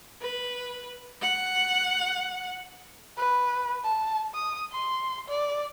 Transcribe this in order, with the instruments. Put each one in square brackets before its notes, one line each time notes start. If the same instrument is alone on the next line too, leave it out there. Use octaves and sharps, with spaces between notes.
[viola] B4
F#5
[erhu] B4
A5
D#6
C6
D5